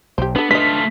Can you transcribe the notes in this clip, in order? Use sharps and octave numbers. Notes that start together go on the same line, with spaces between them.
B1 G4 C5
B3 D4 A4 B4
A3 F4 B4 D#5 B6